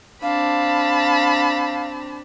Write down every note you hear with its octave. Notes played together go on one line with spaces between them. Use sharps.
C4 D4 F5 A5 B5